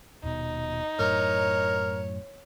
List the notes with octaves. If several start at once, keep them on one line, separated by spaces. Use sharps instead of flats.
D#1 B2 D#4
F#2 A2 A#4 C#5